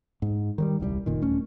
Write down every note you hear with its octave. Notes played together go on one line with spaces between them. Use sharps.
G#2
D#3 F#3 G3
D#1 C2 D3 G3
F1 A#2 D#3
D#1 A3 C#4